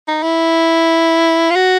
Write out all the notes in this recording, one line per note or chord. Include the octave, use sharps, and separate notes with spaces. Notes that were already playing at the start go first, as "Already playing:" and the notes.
D#4
E4
F4
F#4